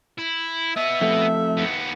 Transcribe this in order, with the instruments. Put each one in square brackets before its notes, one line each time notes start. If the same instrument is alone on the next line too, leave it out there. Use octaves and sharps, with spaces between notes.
[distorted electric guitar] E4
[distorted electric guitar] B3 D#5 [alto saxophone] E5
[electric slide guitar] F2 A3
[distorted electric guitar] D#2 B3